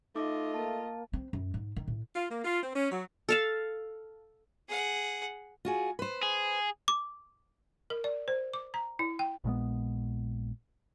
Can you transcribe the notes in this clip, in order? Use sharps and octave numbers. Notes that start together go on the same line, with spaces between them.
A3 D#4 F4 D#5 D6
A#3 A5
C4
F#2
G#2
D#3
A2
F4
A#3
F4
C4
C#4
F#3
A4 F5 A5
G#4 F#5
F4 F#4 G#4
B4 C5
G#4
D6
A#4
D5
C5
D6
A#5
E4
G5
A#1 A#2 G#3 B3